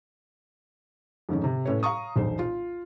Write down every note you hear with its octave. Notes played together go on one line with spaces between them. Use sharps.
F2 G#2 D#3 C#4
C3
A2 C#4 B4 C#5
F5 A#5 C#6 D#6
E1 B1 C5
F4